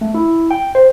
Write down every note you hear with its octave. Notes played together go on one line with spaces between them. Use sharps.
A3
E4
G5
C5